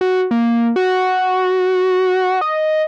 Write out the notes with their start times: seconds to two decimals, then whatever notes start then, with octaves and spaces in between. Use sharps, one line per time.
0.01 F#4
0.31 A#3
0.76 F#4
2.41 D#5